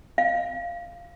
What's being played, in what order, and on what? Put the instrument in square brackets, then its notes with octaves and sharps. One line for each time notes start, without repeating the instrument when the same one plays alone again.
[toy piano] F5